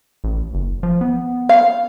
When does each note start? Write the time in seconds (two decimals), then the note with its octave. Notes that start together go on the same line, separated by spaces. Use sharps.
0.24 A1
0.54 F#1
0.83 F3
1.01 B3
1.49 F5